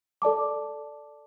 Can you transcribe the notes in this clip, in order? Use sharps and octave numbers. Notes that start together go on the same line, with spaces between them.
A4 D5 A5 D6